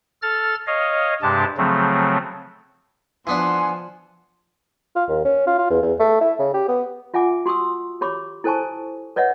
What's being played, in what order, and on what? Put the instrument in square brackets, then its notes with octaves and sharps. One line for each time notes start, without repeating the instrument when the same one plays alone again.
[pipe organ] A4 F6 A6
C#5 D#5 F5
G2 C3 G#3 D4 G4 A5
C#3 F3 F#3 A3 C4
[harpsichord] E3 B3 D4 [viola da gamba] F3 [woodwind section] F#5 G#5 [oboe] C6
[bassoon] F4
D#2
C#4
F4
F4
E2
E2
A3
E4
C#3
G4
B3
[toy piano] F4 E5 F#5 G#5 D6
F#4 C6 C#6 D#6 E6
G4 C#5 B5 C#6 D6
E4 A4 C5 G#5 A5 C#6
B4 C#5 D#5 E5 F#5